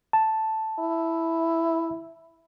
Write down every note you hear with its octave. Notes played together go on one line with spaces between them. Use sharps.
A5
E4